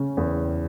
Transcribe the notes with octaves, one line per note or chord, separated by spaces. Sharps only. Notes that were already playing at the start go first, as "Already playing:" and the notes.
Already playing: C#3 C#4
E2